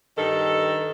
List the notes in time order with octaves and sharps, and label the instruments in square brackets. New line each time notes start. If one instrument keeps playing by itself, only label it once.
[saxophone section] G2 D#3 A4